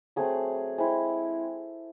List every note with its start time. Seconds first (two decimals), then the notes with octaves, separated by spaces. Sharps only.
0.16 F#3 A3 C4 G#4
0.78 G#3 C4 E4